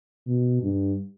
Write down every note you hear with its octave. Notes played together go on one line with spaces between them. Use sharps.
B2
G2